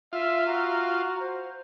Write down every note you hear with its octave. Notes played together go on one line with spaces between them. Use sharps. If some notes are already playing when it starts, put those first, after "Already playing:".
F4 E5
F#4 A#5
C5